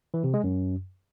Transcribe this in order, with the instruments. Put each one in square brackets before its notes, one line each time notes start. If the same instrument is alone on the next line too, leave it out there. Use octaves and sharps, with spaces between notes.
[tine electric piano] E3
C3
G#3
F#2